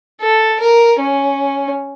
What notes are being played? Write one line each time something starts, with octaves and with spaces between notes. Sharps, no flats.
A4
A#4
C#4